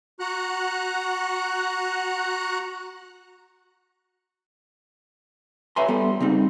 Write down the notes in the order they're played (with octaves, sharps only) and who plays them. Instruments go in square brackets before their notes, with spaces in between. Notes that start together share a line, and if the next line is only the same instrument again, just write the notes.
[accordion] F#4 F#5 A#5 F#6
[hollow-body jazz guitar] B4 C#5 E5 G#5 A#5 C6
G3 B3 A4
C#3 G3 C4 D#4